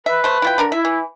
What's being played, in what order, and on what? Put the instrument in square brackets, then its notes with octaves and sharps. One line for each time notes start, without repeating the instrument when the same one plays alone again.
[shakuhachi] B4 [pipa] E5
[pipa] A3 C5
E4 F4 G5
D3 D4 A#4
[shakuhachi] E4 [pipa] E5
[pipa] E3